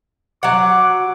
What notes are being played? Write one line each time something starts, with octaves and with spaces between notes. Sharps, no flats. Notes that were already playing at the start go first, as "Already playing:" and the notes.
F#3 F#5 D6